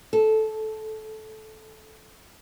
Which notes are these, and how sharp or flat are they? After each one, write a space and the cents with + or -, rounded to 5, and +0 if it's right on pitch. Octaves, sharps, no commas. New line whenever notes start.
A4 -15